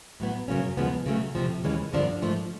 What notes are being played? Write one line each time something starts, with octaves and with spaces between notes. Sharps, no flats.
A2 F#3 B3
F#2 C#3 F#3 A#3 C#4
D#2 C#3 F3 G#3 B3
C#3 F#3 A3
F2 C3 F3
D#2 C#3 E3 G#3 C#4
G2 D3 F3 A#3 D4
G#2 F3 A3